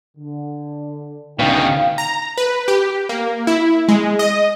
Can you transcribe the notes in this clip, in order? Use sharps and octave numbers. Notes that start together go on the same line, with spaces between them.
D3
C#2 B2 D3 C#4 D#4 F5 G5
A#5
B4
G4
A#3
E4
G#3
D#5